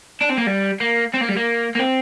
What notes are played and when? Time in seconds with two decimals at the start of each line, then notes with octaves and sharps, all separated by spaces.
0.22 D4
0.30 C4
0.38 A#3
0.47 G3
0.80 A#3
1.14 C4
1.21 A#3
1.29 G3
1.36 A#3
1.75 A#3
1.80 C4